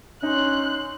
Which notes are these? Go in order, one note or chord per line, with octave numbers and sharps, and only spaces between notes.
C#4 D#4 C6 F#6